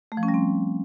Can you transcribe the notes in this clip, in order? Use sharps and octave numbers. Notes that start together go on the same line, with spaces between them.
A3
F3
C#4
G3
C4